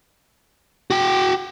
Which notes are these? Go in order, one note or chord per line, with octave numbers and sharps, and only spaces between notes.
F#4 G5